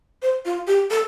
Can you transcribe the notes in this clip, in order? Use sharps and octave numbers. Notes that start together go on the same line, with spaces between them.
C5
F4
G4
A4